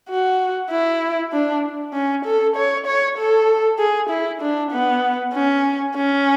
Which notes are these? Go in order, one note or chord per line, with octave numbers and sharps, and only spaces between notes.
F#4
E4
D4
C#4
A4
C#5
C#5
A4
G#4
E4
D4
B3
C#4
C#4